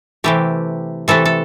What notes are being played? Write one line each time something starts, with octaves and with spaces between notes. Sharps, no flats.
C3 E3 A3 G4
C3 E3 A3 A4
A4